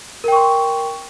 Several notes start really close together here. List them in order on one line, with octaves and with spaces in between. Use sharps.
A#4 G5 C#6 C6